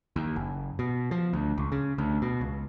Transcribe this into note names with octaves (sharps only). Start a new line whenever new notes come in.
D#2
F#1
B2
F3
D2
C#2
C#3
D2
B2
C#2